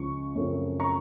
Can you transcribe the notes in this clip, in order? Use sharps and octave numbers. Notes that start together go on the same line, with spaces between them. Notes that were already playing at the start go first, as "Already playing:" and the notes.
Already playing: C#2 C#3 F3 C#6
F#2 C#3 F3 A3 C4
A#5 C#6